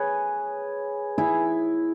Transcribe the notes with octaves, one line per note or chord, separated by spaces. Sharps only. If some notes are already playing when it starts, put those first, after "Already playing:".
Already playing: G#4 B4 C#5
E4 G#4